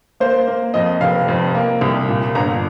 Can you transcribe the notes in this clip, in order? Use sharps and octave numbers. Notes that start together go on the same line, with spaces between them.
A#3 C5
A#3
F2 D#5
F1 F5
F2
A#3
C2
A#2
G1 A#5